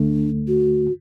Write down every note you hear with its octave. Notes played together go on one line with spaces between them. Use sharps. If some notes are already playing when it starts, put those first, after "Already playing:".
Already playing: D2 D3 A3 D4
F#4